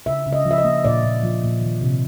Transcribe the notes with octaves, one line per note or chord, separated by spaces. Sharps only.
C#3 E5
C#3
D#5
F3
E5
D#5
A#3
A#2 D5
A#2
F3
A#2
D#3
C3